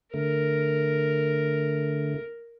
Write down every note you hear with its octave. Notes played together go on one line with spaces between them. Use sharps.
D3 A3 A#4